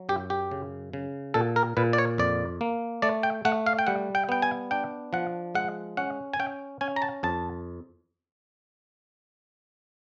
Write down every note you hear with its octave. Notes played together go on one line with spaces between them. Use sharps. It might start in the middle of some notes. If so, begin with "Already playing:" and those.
Already playing: F#3
F#2 G4
G4
C#3
C#3
A#2 A4
A#4
A#2 B4
D5
C#5
F2 D5
A#3
A3 D5
G5
A3 F#5
F5
G5
G3 F#5
G5
B3 G5
G#5
D4 G5
F3 F#5
G#3 F#5
C#4 F#5
G#5
C#4 G5
C#4 G#5
A#5
A5
F2 A5